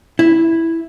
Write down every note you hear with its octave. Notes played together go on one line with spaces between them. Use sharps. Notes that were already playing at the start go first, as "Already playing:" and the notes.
E4